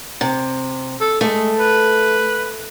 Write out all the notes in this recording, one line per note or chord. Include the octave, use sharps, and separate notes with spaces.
C3
A4
G#3 A3
B4